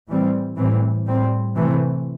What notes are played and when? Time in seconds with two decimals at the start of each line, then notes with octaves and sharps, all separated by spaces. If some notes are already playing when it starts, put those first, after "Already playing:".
0.08 A2 E3 G3 C4
0.57 A2 E3 G3 C4
1.06 A2 G3 C4
1.56 C3 E3 A3 C4